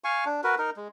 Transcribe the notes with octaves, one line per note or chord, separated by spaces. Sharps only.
F5 G#5 C#6
D4
F#4 A#4 B4
D#4 A#4
G#3